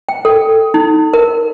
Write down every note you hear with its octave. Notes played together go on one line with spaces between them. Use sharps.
G5
A4
D#4
A#4